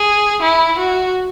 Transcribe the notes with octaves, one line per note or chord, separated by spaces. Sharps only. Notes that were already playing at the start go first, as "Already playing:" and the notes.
Already playing: G#4
E4
F#4